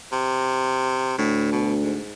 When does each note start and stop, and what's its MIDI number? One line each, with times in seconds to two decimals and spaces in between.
0.12 1.16 48
1.18 2.00 38
1.18 1.49 45
1.52 1.73 47
1.82 2.13 44